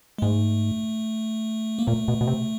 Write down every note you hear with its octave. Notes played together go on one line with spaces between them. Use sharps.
G#3
G#2 A3
A#3
A#2 A3
B2
B2
C3